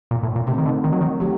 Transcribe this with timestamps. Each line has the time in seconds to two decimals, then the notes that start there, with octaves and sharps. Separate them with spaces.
0.11 A#2
0.23 A2
0.36 A#2
0.47 C3 A3 C4 D#4
0.58 D#3
0.65 D3
0.84 D#3
0.93 F#3
1.01 D#3
1.20 F#3 A3 D#4 G4